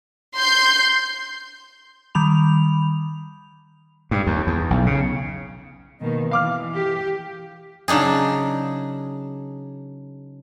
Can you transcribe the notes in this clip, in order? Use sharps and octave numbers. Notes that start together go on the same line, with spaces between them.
C6 G6
D#3 G3 B5 F7
G2
D#2
E2
B1
C#3
B2 D#3 A#3
E3 F5 D6 F6
G4
C#3 F#3 D4 D#4 G#4